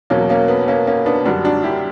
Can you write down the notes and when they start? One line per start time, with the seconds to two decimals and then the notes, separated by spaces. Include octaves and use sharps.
0.10 E2 B2 F#3 A#3 C#4
0.29 A#3 C#4
0.48 B3
0.68 A#3 C#4
0.87 A#3 C#4
1.06 B3 D4
1.25 F#2 D3 G3 D4 F#4
1.44 D4 F#4
1.63 E4 G4